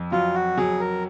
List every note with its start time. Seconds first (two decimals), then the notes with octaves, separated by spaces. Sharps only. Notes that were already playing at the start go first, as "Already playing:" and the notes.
Already playing: F2
0.12 F#3 F4
0.34 F#4
0.57 F#3 G#4
0.80 A#4